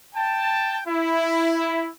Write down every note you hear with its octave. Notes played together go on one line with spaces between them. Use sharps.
G5 A5
E4